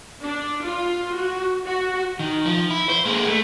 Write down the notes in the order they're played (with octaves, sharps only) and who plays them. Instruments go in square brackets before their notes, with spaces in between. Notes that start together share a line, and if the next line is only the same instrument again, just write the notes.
[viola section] D4
F4
F#4
F#4
[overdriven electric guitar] D#3
F3
E4
C5
G#3 A#3
A3